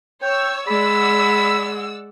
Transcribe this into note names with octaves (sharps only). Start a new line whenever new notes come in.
C#5 G5 E6
G#3 D5 F#5 B5 E6